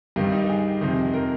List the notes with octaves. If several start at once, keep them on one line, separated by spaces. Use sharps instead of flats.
G2 D#3 G3
D#4
G#4
F2 C3 D#3
A#4